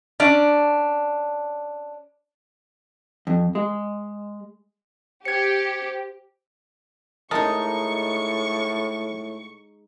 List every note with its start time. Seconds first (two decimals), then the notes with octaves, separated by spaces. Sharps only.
0.20 C#4 D4 D5
3.27 F2
3.55 G#3
5.25 G4 C5 G#6 C#7
7.31 A2 G#3 D#4 A#4 D#5 A5 C#6